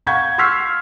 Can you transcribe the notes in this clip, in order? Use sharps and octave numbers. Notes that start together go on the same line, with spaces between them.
F5 F#5 C#6 G6 G#6
C6 C#6 E6 F6 B6 C7